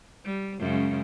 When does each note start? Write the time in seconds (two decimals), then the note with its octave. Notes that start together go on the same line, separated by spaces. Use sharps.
0.25 G3
0.60 F#2 C#3 G#3